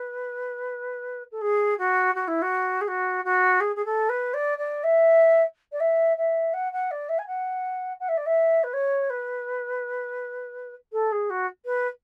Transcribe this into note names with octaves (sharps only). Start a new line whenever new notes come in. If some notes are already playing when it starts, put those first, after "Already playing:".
Already playing: B4
A4
G#4
F#4
F#4
E4
F#4
G#4
F#4
F#4
G#4
G#4
A4
B4
D5
D5
E5
D5
E5
E5
F#5
F#5
D5
E5
G#5
F#5
F#5
E5
D5
E5
B4
C#5
B4
A4
G#4
F#4
B4